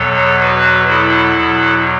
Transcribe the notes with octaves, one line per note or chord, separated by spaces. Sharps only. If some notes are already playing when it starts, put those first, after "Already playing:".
Already playing: E2 B2 F#3 A4 C#5
F#4 B4
E4 A4
E2 B2 F#3